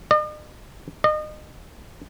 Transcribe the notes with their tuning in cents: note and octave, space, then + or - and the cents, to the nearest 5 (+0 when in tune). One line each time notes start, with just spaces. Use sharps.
D#5 -45
D#5 -30